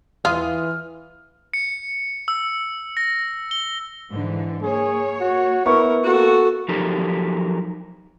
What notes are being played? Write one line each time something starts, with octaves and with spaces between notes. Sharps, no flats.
E2 E3 F4 F5 D#6 F6
C#7
E6
A#6
G7
G#2 D3 E3
A#3 G#4 C#5
F#4
B3 E4 A#4 C#6
A#3 F#4 A4
F3 F#3 D#4 G4 A4 A#4